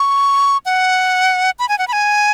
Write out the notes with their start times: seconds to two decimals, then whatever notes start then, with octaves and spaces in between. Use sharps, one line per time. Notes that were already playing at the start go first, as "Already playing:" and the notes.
Already playing: C#6
0.66 F#5
1.59 B5
1.69 G#5
1.78 F#5
1.88 B5
1.93 G#5